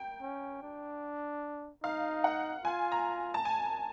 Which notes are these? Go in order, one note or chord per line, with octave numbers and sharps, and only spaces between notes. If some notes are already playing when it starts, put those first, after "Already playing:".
Already playing: G5
C#4
D4
D#4 F5
F#5
F4 G#5
A#5
A5
G#5